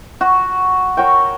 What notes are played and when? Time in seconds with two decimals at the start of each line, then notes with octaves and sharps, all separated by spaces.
0.21 F#4
0.97 F#4 A#4 C#5 G5